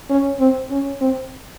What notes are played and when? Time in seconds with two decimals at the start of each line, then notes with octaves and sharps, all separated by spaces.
0.10 C#4
0.40 C4
0.71 C#4
1.01 C4